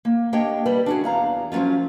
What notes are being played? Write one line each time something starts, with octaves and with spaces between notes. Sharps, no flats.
A#3
A#3 D4 G4 C#5 D#5 G5
G3 B4
D4 F#4 G#4
E2 F5 A#5
F3 F#3 A3 C#4 F4